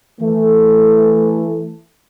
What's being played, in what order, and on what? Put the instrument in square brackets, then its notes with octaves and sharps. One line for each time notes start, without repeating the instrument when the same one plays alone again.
[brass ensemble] E3 A3